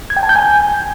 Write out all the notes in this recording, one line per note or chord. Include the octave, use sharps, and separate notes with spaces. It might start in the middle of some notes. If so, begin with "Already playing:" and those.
G#6
G5
A5
G6
G#5